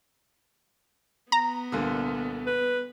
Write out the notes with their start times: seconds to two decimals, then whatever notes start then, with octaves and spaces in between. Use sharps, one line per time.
1.32 B3 A#5
1.72 C2 A#2 D3
2.47 B4